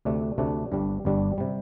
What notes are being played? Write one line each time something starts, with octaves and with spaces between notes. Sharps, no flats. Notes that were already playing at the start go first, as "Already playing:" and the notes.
D2 C3 A3 D4
D2 C3 A3 D4
G1 G2 G3 D4
G1 G2 G3 D4
C3 G3